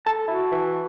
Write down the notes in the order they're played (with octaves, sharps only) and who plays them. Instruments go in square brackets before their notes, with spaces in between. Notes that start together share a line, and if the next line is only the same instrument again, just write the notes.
[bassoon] A4 [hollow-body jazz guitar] A5
[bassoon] E4 [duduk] F#4
[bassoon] E3